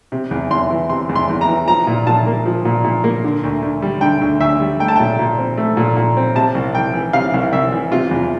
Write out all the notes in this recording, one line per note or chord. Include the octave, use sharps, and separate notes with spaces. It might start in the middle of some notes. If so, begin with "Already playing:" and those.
C3
E2
E2 C6
E3
C3 C6
E2
C6
E2
A#5
E3
F3 A#5
A#2
A#2 A5
A#3
F3
A#2
A#2
A#3
D3
D2
D2
G3
D3 G5
D2
D2 E5
G3
A3 G5
A5
A#2 G5
A#2
C4
A3
A#2
A#2
C4
C3 A5
C2
C2 G5
E3
C3 F5
C2
C2 E5
E3
C3 F4
E2